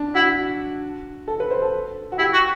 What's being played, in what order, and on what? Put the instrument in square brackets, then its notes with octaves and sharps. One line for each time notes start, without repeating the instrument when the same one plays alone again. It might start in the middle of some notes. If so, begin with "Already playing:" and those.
Already playing: [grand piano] D4
[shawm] E4 [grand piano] F#4
[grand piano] A4
B4
C5
A4
F#4
[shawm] E4 [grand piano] G4
[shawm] F#4